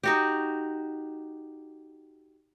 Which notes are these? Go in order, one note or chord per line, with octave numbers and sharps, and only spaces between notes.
D#4 F#4 G4